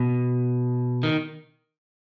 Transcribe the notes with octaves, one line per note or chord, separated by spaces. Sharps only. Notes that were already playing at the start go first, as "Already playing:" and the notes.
Already playing: B2
D#3